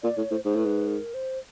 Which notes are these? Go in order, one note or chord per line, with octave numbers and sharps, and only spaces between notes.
A#2 D5
A2 C#5
A2 C5
G#2 C5
A2 B4
G#2
A#4
C5